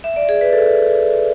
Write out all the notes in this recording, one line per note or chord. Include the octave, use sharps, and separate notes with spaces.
E5
D5
G#4
B4
A4